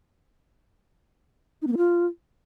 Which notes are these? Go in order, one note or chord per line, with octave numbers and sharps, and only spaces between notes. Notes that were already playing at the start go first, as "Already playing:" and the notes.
D#4
B3
A#3
F4